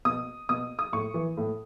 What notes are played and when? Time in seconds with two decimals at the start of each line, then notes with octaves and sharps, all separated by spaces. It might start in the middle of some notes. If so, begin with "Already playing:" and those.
0.05 B2 D#6
0.49 B2 D#6
0.79 D#6
0.93 A2 C#6
1.14 E3
1.37 A2